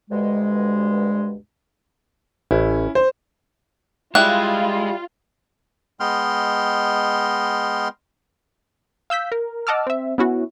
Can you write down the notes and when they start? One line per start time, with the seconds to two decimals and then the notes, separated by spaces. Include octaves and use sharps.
0.10 D2 G2 B2 G#3
2.51 A1 C#4 E4
2.95 C5
4.15 G3 G#3 E4 F4 F#6
6.00 G#3 B3 D#5 G5 C6 F6
9.10 F5 E6 G6 B6
9.32 A#4
9.67 D#5 F#5 A5 D6 E6 F6
9.87 C4 E5
10.18 B3 C#4 E4 F#4